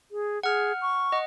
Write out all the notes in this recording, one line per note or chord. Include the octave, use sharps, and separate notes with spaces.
G#4
G#4 F#5 F6
C#6
D#5 F#5